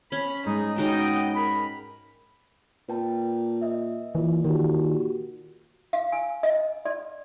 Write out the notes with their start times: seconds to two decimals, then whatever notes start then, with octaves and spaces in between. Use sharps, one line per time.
0.12 C#4 B5
0.46 G#2 G#3 D#4 G#4
0.78 B3 C#4 D#4 F#4 D#5 G5
1.35 A#4 B5
2.89 A#2 B4 G5 A5
3.61 D#5 E5
4.15 A#2 E3
4.45 A#2 D#3 F#4 G4
5.93 F5
6.12 G#5
6.43 D#5
6.85 D5